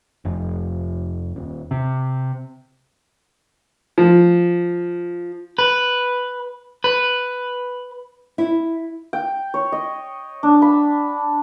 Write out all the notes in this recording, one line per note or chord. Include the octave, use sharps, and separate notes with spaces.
F1
D#1
C3
F3
B4
B4
E4
G5
C#5
D#5
D4
B5